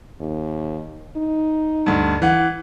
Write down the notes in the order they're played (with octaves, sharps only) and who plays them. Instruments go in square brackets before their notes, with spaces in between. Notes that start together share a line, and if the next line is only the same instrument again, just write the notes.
[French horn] D#2
D#4
[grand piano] D2 G2
E3 F#5